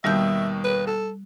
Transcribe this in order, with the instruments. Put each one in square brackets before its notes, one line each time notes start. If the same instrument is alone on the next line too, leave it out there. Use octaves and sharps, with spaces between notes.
[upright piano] D#2 B2 D#3 [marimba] G3 G6 [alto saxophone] E5
[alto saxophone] B4
A4